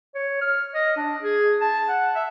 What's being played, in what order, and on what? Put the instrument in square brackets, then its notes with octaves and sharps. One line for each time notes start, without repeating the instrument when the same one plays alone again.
[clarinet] C#5
F6
D#5
D4
G#4
A5
F#5
E5